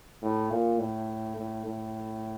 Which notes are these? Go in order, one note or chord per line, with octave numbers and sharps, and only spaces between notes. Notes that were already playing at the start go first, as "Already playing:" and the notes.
A2
A#2
A2
A2
A2